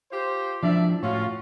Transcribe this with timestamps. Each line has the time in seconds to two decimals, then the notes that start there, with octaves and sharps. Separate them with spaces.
0.11 F4 G4 C5
0.63 F3 D4 E4 D5 E5
1.03 A2 C#4 F4 F#4